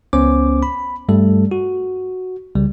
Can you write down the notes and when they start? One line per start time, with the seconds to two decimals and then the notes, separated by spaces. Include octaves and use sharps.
0.13 C#2 B3 C#4 C5 D6
0.63 B5
1.09 G2 G3 A3 A4
1.51 F#4
2.55 C2 C#3 G3